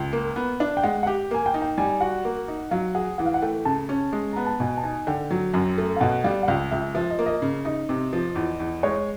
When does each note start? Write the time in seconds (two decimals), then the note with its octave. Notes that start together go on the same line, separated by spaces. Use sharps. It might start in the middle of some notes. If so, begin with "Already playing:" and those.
Already playing: C#2
0.13 A#3
0.36 B3
0.60 D4
0.77 G5
0.83 G#3 F#5
1.03 F#5
1.07 G4 G5
1.31 A#3 G#5
1.46 G5
1.54 D#4
1.62 G5
1.78 G3 G#5
2.01 F#4 F#5
2.25 A#3
2.48 D#4
2.71 F#3 F5
2.95 G#4 F#5
3.18 E3 F#5
3.26 F5
3.34 F#5
3.42 A3 G5
3.65 C#3 A5
3.89 C#4
4.13 G#3
4.33 B3 A#5
4.47 A5
4.60 B2 G#5
4.78 A5
4.83 D#4 G#5
5.07 D3 G5
5.31 F#3
5.54 F#2
5.78 A3
5.96 F5
6.00 B2 F#5
6.24 G3 F5
6.43 F#5
6.48 C#2 F5
6.71 C#2 E5
6.94 F3 E5
7.11 D#5
7.19 A#3
7.26 D#5
7.42 C#3
7.65 D#4 D#5
7.89 C3
8.13 F3
8.36 E2
8.60 E2
8.83 G#3 C#5